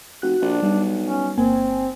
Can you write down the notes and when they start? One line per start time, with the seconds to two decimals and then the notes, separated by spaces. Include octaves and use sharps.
0.22 F1 F#4 F#6
0.42 A#1 D4
0.62 B1 G3
1.04 C#4
1.38 G1 A#3 C4 G#5